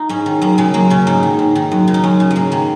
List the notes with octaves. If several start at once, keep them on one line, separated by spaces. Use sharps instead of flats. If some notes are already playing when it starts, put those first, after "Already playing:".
Already playing: D#4 F4
G#2 C#4
D#3
F#2 A#3
C#3 G#3
F#2 A#3
C#3 C#4
G#2 D#4
D#3
G#2
D#3
F#2
C#3
D#4
F#2 C#4
C#3
G#3
G#2 A#3
D#3 A#3